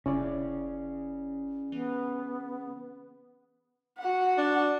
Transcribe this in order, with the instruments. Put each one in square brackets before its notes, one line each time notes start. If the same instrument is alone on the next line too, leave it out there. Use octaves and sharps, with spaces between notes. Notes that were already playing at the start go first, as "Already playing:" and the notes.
[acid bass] F#1 [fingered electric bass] C#3 [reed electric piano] C#4 E4 D5
[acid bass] E3 [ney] B3
[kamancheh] F#4 F#5
[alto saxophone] D4